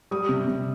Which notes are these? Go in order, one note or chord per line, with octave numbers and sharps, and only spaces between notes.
G3 D#6
C3
C3